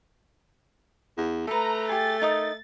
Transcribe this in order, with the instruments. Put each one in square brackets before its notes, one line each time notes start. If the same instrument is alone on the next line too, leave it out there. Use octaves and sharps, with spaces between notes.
[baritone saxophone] E2
[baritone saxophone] A3 [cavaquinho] A4 B4 [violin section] A#5
[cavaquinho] G4 G#4 [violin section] A6
[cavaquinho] D#4 A#4 D#6